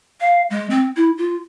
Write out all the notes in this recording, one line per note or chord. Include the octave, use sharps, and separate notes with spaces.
F5
G#3
C4
E4
F4